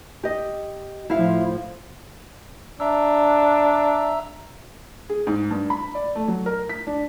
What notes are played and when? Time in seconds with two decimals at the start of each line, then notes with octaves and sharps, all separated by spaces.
0.23 G4 D#5
1.10 A2 F3 E4 E5 F5
2.80 D4 E5 A#5 E6
5.10 G#4
5.27 G#2
5.51 G2
5.70 B5
5.95 D5
6.15 A3
6.28 F#3
6.46 A#4
6.69 B6
6.87 D4